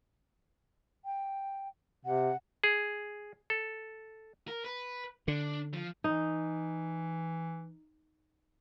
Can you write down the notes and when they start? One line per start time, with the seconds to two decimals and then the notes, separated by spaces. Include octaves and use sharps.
1.05 G5
2.05 C3 F#5
2.64 G#4
3.50 A4
4.48 A#4
4.65 B4
5.28 D3 D4
5.74 F3
6.04 E3 D#4